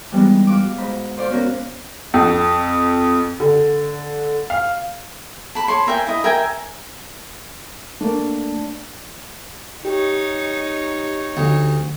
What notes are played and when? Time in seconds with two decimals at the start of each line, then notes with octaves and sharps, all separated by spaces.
0.11 E3 G3 G#3 B3 D#4
0.47 F#4 F5 D6
0.78 G#2 B5
1.18 C5 D5 F5 C6
1.30 B3 C#4 F#4 A#4
2.14 F2
3.40 D3
4.50 F5
5.55 A5 B5
5.68 C#5 A5 B5 C6
5.87 A#4 E5 G5 G#5
6.07 E4 D#5
6.24 A#4 E5 G5 G#5
8.01 A3 A#3 D4
9.85 D#4 G4 C#5
11.37 D2